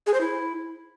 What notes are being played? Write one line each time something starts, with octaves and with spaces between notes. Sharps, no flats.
G#4
C5
E4